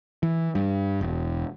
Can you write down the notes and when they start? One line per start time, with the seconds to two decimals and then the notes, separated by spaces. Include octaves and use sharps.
0.23 E3
0.55 G2
1.01 E1